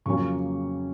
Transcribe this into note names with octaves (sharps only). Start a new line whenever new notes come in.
F2 C#3 F#3 A#3 C#4 C#6